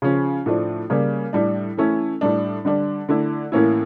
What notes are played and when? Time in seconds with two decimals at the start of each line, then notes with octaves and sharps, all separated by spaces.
0.02 C#3 F3 C#4
0.46 A2 F3 A3 D4
0.90 C#3 G3 A#3
1.33 A2 G3 D4
1.77 E3 A3 C#4 E4
2.21 A2 G3 D4
2.65 D3 G3 D4
3.09 D3 A3 E4
3.52 A2 E3 A#3 C#4 E4